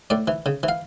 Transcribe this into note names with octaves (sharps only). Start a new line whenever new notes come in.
A2 D5
E3
C#3
E3
F5